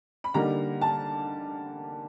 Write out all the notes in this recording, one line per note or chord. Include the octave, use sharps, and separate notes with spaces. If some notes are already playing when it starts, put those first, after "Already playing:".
B5
D3 G3 A#3 D#4 A#5
A5